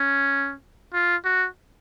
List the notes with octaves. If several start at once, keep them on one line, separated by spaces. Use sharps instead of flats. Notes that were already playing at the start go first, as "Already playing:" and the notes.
Already playing: C#4
F4
F#4